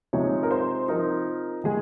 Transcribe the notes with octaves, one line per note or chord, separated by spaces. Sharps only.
C3 F3 G#3 D#4 C#5
A#4
C5
F3 C4 D#4 A#4
D#3 G#3 G#4